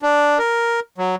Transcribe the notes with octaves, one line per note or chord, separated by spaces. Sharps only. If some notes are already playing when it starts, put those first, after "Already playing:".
D4
A#4
F#3